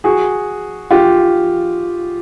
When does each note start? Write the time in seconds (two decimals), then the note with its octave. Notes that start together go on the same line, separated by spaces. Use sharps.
0.04 F#4 G#4
0.91 F4 G4